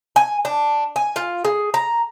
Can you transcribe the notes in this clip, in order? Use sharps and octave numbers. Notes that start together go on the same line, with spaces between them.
G#5
D4
G#5
F4
G#4
A#5